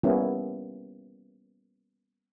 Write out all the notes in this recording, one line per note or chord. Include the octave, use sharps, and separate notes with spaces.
G3 A#3 B3 C#4 E4